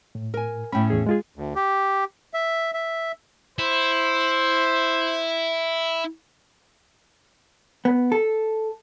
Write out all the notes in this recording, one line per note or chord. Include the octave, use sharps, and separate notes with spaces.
A2
A#4 G#5
A2 C#4 G5 B5
E2 G#4
G#3 F4 G#4
D2
G4
E5
E5
E4 C5
B3
A4